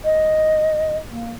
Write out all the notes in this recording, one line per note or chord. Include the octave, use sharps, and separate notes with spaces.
D#5
A#3